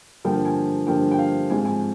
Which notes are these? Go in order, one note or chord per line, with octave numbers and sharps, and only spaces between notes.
G2 D3 F3 A#3 G5
G#5
G2 D3 F3 A#3 G5
G5
F5
G#2 F3 C4 G#5
G#5